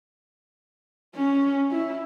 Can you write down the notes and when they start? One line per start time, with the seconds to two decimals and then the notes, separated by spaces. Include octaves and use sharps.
1.16 C#4
1.72 E4